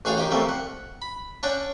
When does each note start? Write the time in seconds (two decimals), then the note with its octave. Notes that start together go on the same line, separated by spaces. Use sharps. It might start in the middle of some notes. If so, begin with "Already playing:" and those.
0.05 A1 F#4 G#4 F5 G5 A5
0.18 D#3 G4 D#5
0.31 C2 F3 G3 A3 A#3 C4
0.49 F#5
1.02 B5
1.43 C#4 D4 C#5 F#5 G5 A5